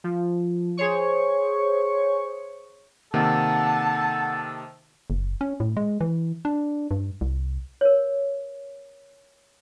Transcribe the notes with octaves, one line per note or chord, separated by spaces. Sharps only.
F3
G#4 C5 C#5 C#6
C3 D#3 A#3 A4 F#5 A5
F#1
C#4
A2
G#3
E3
D4
G2
C2
A#4 C#5